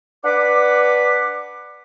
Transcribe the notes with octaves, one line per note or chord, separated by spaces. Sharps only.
D4 B4 F#5 D6